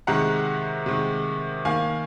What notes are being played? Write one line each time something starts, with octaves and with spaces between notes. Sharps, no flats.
C3 D#3 G#3 F#5 A#5
C3 D#3 G#3
D#3 A#3 F5 G#5